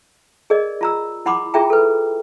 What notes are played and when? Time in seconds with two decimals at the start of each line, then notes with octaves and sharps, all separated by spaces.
0.50 G#4 A#4 D5 D#5
0.81 F4 A#5 E6
1.26 E4 F#5 B5 C6 D6
1.54 E4 F4 G#4 E5 G5 A#5
1.70 A4 B4